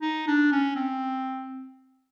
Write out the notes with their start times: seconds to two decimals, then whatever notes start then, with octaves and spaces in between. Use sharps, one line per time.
0.02 D#4
0.28 D4
0.52 C#4
0.76 C4